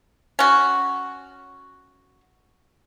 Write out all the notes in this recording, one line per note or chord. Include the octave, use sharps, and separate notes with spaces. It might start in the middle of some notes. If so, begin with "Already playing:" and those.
C#4 F#4